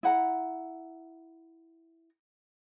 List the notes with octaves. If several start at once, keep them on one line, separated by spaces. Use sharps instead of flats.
E4 F#5 A#5